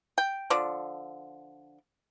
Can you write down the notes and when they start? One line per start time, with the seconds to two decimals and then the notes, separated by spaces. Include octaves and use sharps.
0.18 G5
0.50 D3 F3 D5